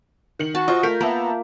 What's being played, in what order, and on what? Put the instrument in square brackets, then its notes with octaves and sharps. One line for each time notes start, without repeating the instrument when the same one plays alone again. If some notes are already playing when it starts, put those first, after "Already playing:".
[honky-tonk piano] D#3 C#7 F#7
[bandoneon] F#4 [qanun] A5
[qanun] F4 [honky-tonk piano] C5 D#5
[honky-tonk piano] A3 G6 B6 [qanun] A#4
[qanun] A#3 [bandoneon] B3 [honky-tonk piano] E5 A5 A#5